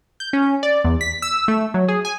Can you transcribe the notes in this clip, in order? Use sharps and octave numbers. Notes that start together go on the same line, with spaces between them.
G6
C#4
D5
E2
B6
E6
A3
F#3
G#4
G#5